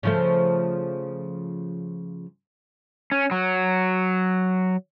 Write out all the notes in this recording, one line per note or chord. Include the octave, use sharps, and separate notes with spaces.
C#3 F3 A3
C#4
F#3